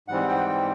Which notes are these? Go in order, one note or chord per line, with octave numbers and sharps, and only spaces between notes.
G#2 E3 G3 C4 F#5
G5
G5